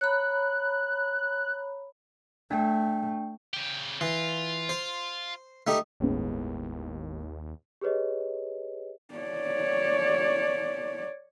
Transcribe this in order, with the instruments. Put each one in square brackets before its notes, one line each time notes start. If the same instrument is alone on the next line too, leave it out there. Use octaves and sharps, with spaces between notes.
[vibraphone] C#5 A#5 B5 [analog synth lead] F#6
[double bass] A3 [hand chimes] D4 G5
[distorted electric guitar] C#3 G4
[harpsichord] E3 [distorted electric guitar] F4
[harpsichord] C5
A3 D#4 G4
[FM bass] G1 [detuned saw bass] D#2 [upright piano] A2 G#3 B3
[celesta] G4 G#4 B4 C#5 D#5
[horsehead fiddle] C#5 D5